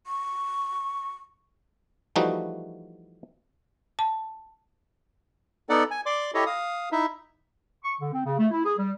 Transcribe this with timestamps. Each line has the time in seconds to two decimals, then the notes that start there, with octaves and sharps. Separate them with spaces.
0.07 C#6
2.16 E3 F3 G3 A3 D#4 F#4
3.99 A5
5.69 B3 D#4 A4 D5 F#5
5.91 G#5
6.06 D5 C6 D6
6.34 E4 G4 A4 C#5 D#5
6.46 F5 D#6
6.92 D#4 E4 E5
7.83 C#6
8.00 D3
8.12 C4
8.26 C#3
8.38 A3
8.51 E4
8.64 G#4
8.78 G3